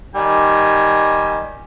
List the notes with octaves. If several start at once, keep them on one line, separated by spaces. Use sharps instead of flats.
D#3 G3 G#5